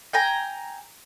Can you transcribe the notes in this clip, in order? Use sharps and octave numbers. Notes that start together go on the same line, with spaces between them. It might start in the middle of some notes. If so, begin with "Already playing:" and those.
G5 G#5 A#5